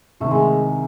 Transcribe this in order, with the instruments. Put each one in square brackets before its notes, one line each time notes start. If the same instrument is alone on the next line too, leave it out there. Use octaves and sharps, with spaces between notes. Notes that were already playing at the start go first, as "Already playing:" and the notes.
[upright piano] C2 C3 D#3 [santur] A3
[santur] G#3